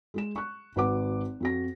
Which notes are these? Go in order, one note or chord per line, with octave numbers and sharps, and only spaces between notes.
G#3 G#4 E7
C#6 F#6
G#1 F#4 B4 F#5 D6
F2 F#4 A#6